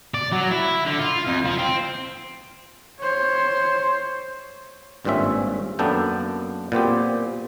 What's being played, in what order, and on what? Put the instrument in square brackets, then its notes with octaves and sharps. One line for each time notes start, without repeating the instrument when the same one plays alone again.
[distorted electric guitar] D5
F#3
E4
D3
F4
F2
F3
C4
[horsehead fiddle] C5 C#5
[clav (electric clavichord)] G#1 G2 A#2 C4 C#4 E5
F#2 A#3 B3 D4 A4 G5
A#2 B3 C4 G4